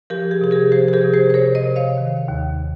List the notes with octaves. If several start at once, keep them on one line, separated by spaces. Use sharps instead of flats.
F3 G4 A#4
G#4
C3 G#4
G4 A#4
F3 G#4 C5
G#4
G4 A#4
C3
G#4 C5
C5
C3 A#4 C#5
C5 D#5
C3
C#5 F5
D#3
D#2